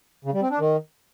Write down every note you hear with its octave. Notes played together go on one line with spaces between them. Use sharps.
C#3
G3
C4
D4
D#3